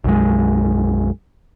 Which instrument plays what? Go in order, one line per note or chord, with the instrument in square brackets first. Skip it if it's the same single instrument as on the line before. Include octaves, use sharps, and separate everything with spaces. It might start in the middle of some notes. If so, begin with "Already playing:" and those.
[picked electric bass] B1 F#2 G#3